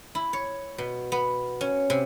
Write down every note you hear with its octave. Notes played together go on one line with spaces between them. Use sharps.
E4
C#5
B2
B3
C#4
C3